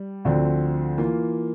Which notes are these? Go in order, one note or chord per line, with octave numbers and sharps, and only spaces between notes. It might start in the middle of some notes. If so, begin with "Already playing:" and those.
Already playing: G3
D2 D3 F3 A3 C4
E3 A#3 F4